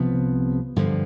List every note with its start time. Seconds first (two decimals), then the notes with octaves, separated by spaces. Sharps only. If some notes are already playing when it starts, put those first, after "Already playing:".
Already playing: C2 C3 F3 B3
0.76 G2 D3 F3